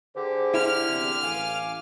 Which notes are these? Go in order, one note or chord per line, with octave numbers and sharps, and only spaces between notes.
D3 G4 G#4 C5
E4 F6
E2 C3
A1 F5 G#5 D6